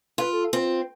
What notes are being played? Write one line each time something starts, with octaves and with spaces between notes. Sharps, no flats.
F4 B4
A4
C4 F4